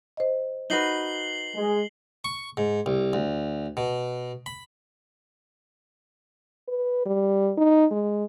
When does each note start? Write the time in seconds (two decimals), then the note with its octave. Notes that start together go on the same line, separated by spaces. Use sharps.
0.17 C5 D#5
0.70 D#4 F#4 B4 C7 F#7 G7
1.56 G#3
2.24 C#6
2.57 G#2
2.86 C2
3.13 D2
3.77 B2
4.46 B5
6.68 B4
7.05 G3
7.57 D#4
7.91 G#3